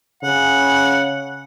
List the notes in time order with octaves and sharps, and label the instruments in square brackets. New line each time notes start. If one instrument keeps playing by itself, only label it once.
[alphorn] C#3 [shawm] F#5